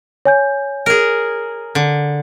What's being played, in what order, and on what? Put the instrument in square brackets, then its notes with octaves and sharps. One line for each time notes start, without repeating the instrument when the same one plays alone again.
[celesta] C#5 G#5 G6
[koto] G#4 A#4
D3